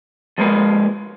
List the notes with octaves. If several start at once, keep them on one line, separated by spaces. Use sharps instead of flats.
F3 G#3 A#3 A#4 B4